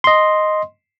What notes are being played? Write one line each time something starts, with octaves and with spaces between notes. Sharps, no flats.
D#5 C6